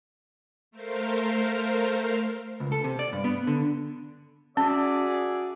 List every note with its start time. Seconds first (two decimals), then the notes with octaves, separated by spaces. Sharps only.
0.71 A3 A#4 C5 F5
2.60 C#2
2.72 A4
2.84 C3
2.99 D5
3.12 G2
3.24 B3
3.47 D3
4.57 C#4 F#4 G#4 D5 E5